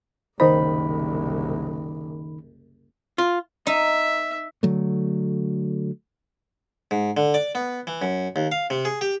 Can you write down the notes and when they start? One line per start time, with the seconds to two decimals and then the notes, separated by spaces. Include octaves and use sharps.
0.40 F#1 C2 D#3 D#4 C5 B5
3.18 F4
3.67 D#4 E5
4.63 D3 F#3 A3
6.91 G#2
7.17 D3
7.34 D5
7.55 B3
7.87 E3
8.02 F#2
8.36 D#2
8.52 F5
8.70 C3
8.85 G#4
9.01 G4